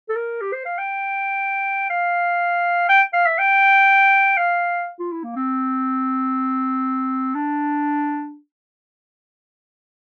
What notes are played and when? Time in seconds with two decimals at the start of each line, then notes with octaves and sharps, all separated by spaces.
0.09 A4
0.16 A#4
0.41 G4
0.53 C5
0.66 F5
0.78 G5
1.90 F5
2.89 G5
3.13 F5
3.26 E5
3.39 G5
4.37 F5
4.99 F4
5.12 E4
5.24 A#3
5.36 C4
7.35 D4